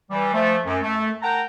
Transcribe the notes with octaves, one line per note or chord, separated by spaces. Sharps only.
E3 G3
F3 A3
F#2
A3
A#4 F#5 G5 A5 A#5